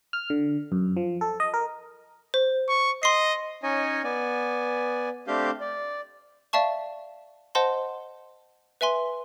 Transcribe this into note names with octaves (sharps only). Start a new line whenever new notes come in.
F6
D3
F#2
F3
A4
D#5
A#4
C5
C#6
D#5 C6 C7
C#4 D#4 C#5 D#5 G#5
B3 D5 G#5
A3 C4 D4 G4 F5 G6
D5
D5 E5 F5 A5 C#6
C5 D#5 F#5 A5 C6
B4 E5 G#5 C6